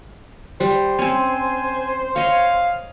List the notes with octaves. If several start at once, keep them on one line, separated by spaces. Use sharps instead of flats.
G3 C5
C4 C#4 G#5
C#5 D#5 F5